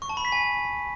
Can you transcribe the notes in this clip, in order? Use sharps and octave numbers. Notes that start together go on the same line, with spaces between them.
C#6
A5
B5
B6
G#5